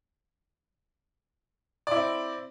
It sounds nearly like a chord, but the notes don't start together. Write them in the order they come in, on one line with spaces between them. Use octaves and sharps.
D5 E4 C4